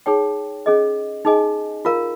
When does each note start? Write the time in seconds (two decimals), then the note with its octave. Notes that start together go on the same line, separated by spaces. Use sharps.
0.06 D#4 G#4 C#5 G5
0.66 C#4 G#4 D#5
1.25 D#4 G#4 D#5 G#5
1.85 F4 A#4 F5 A#5